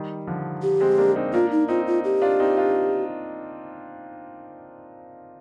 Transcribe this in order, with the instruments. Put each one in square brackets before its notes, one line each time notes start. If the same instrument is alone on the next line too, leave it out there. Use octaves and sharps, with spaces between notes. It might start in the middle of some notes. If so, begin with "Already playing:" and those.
Already playing: [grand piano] D#3 G3
D3 F3
[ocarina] G4
[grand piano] G#3 C4
A#3 D4
C4 D#4
[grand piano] A#3 D4 [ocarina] F4
[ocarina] D#4
[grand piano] C4 D#4 [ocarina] F4
[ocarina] F4
G4
[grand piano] D4 F4
C4 D#4
D4 F4